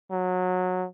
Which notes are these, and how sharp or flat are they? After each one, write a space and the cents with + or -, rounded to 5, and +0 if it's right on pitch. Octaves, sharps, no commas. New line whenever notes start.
F#3 -20